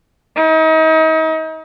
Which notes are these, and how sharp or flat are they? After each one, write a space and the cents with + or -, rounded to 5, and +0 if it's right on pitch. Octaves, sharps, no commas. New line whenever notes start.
D#4 +35